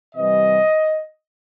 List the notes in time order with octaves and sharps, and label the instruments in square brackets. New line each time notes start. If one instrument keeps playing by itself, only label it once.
[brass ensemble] C3 E3 G3 D#5